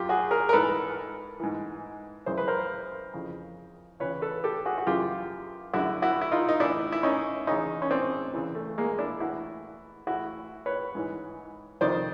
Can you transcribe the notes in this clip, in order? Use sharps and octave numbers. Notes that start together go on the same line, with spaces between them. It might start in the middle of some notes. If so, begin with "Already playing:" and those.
Already playing: F#2 F4 G4
F#4 G#4
G#4 A#4
A#4
G#2 E3 A4 B4
G#2 E3
F#2 C#3 E3 C5
B4
A#4 C5
F2 C#3 E3
E2 C#3 E3 B4 C#5
A4 B4
G4 A4
F#4 G#4
F#4
F#2 C#3 E3 F4 G4
F#2 D3 E4 F#4
E4 F#4
E4
D#4 F4
D#4
A2 E3 D4 E4
E4
C#4 D#4
E2 C#3 E3 C#4 D#4
C#4
C4 D4
E2 C#3 E3
A3
G#3 A#3
D4 E4
A2 E3 E4 F#4
A2 E3 E4 F#4
B4 C#5
G#2 E3
F2 C3 D#3 C5 D5